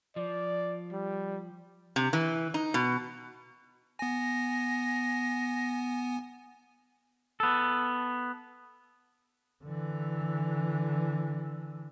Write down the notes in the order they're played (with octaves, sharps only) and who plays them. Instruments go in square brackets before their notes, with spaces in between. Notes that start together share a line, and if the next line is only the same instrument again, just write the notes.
[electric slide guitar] F3 [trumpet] D5
[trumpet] G3
[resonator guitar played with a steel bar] C3
E3
D#4
B2
[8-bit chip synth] B3 G#5 [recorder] A#6
[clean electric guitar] B3 A4
[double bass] D3 E3